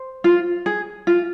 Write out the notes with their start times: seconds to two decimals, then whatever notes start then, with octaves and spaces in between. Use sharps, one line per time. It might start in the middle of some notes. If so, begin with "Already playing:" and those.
Already playing: C5
0.24 F4
0.66 G#4
1.07 F4